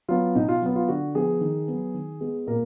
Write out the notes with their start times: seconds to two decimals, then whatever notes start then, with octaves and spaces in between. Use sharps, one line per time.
0.08 F#3 B3 F4
0.35 B2 D#4
0.48 F4
0.62 F#3 B3
0.75 F4
0.88 D3 F#4
1.15 F3 B3 G#4
1.41 D#3
1.68 F#3 B3
1.94 D#3
2.20 G#3 B3
2.47 A#2 A#4